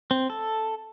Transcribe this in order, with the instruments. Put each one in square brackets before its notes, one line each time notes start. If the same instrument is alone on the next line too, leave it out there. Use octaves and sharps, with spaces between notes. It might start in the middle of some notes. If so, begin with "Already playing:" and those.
[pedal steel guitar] C4
A4